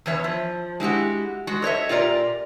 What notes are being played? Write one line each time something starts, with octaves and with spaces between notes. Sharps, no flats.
E2 E3 C#5 E5
F3
G#3 E4 F#4 G4
G#3 F#4
A4 C#5 D#5 E5
A#2 F4 G4 A#4 D5